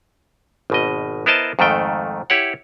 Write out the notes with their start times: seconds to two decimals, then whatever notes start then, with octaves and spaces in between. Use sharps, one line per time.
0.70 G#1 B2 D#5
1.26 B3 E4 A#4 C5 D#5 A5
1.59 F2 G#2 D#3 A3 G5
2.30 E4 G4 C#5 F#5